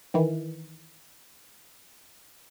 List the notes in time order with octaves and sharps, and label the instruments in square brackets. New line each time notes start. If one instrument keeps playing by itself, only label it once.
[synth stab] D#3 E3